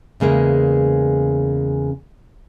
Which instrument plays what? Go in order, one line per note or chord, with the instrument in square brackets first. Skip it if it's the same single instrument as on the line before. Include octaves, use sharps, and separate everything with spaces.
[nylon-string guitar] E2 C#3 G#3 A#3